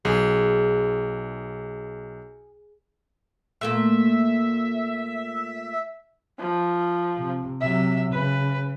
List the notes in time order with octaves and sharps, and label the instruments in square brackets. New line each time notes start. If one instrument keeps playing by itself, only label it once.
[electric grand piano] B1 [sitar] G#4
[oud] A#2 A3 A#3 [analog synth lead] E5
[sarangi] F3
[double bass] C3
[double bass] C3 F#3 [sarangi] E5
[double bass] C#3 [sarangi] B4